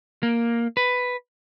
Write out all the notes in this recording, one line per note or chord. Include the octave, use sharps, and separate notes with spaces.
A#3
B4